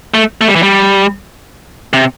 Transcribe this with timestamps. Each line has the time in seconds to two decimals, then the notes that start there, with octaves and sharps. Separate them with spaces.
0.14 A3
0.41 A3
0.48 G3
0.56 E3
0.63 G3
1.93 C3